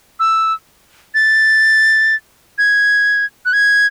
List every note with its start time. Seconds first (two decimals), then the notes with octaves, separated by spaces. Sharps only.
0.20 E6
1.15 A6
2.58 G#6
3.46 F#6
3.53 G#6